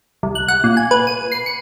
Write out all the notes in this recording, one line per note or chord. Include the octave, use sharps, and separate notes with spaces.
C2
F#6
F#5
A#2
G#5
B4
D#7
C7
C#7